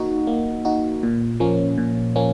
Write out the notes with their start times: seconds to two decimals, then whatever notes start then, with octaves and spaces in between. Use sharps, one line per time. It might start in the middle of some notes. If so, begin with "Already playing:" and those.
Already playing: A#3 D#4 F#4
0.27 A#3
0.65 D#4 F#4
1.03 A#2
1.40 F3 A#3 C#4
1.78 A#2
2.16 F3 A#3 C#4